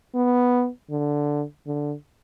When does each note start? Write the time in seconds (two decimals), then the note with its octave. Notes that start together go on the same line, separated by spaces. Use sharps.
0.15 B3
0.90 D3
1.67 D3